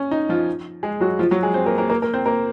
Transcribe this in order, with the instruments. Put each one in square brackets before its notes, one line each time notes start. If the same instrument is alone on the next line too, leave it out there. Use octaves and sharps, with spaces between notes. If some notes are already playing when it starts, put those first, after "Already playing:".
Already playing: [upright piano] C#4
D#4
F3 F4
G#3 G#4
F#3 F#4
F3 F4
F#3 F#4
G#3 G#4
C4 C5
A#3 A#4
A#3 A#4
A#3 A#4
A#3 A#4
C4 C5
A#3 A#4